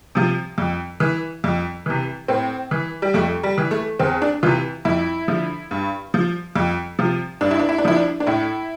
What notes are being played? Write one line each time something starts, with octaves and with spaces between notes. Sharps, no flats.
C3 F3
F2
E3
F2
C3 E3
A2 C4
E3
G3
F2 A3
G3
E3
A3
E2 C4
D4
C3 E3 F4
F2 E4
D3 F3
G2
F3
F2
C3 F3
G2 D4
E4
D4
E4
D4
F3 E4
D4
D4
A2 E4